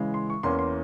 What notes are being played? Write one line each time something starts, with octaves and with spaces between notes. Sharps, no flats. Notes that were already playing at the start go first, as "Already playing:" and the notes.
Already playing: C#3 E3 G#3
C6
C#6
E2 E3 A#3 C#4 C6
C6